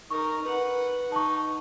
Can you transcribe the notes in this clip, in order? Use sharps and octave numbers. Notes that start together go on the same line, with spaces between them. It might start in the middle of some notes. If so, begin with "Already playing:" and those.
D#4 A#4 C#6
B4 F#5
D#4 A5 C#6